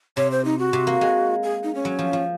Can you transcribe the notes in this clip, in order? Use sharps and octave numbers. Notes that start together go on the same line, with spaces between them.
C3 C#5
C5
D#4
F#4
C3
A#3
G#3
G#4
D#4
C#4
F#3
F3
F3